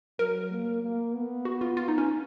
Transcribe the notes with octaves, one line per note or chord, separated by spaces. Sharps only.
F#3 A#4
A#3
A#3
B3
F#4
F4
F4
D#4
C#4